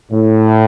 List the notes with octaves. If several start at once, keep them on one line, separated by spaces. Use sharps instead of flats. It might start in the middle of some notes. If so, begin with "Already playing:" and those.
A2